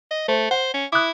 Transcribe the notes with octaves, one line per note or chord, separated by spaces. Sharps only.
D#5
A3 C5
C5 F#5
C#4
E4 D6 D#6 F#6